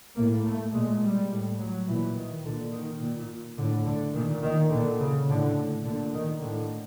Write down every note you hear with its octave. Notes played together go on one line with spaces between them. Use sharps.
A2 A#3
A3
A#2 G#3
G3
A2
F#3
A#2 E3
D#3
A#2 D3
D#3
A#2
A2 D3
D3
A#2 D#3
D#3
A#2 D3
C#3
A2 D3
A#2 D3
D#3
A2 D3